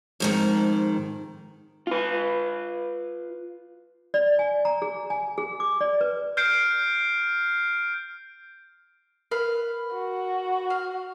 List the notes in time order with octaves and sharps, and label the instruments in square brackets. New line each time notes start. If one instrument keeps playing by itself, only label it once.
[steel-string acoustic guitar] F2 G#2 D#3
[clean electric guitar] F4 B4
[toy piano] D5
G#5
A#5
G#4
G#5
G#4
D6
D5
B4
[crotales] F6 G6 C7 D7
[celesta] A#4 [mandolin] B4 F5
[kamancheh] F#4
[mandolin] F5